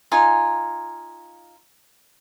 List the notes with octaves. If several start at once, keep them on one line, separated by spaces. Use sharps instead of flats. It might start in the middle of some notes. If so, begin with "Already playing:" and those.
D#4 F4 G#5